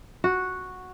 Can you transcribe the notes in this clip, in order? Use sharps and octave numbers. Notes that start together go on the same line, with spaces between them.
F#4